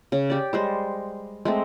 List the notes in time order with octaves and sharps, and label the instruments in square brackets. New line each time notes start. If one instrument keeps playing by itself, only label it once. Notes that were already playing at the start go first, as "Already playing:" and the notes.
[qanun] C#3
G4 D5
G3 G#3 C5
G#3 A3 C4